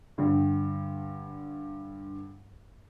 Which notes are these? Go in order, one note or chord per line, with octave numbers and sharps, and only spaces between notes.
G2 D3